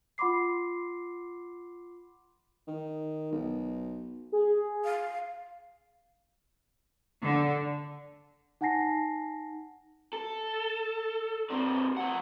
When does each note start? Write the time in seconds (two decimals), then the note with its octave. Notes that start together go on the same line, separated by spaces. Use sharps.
0.18 F4 F#5 B5 C6 D6 C7
2.68 D#3
3.32 B1
4.32 G#4
4.85 F5
7.23 D3
8.61 D#4 F#5 G#5 A5 A#6 C7
10.13 A4
11.50 A#2 C4
11.97 F3 F#5